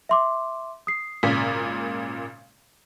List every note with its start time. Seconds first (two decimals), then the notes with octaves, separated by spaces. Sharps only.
0.09 E5 C6 D6
0.87 D#6 C7
1.23 G#1 A#2 C#3 B6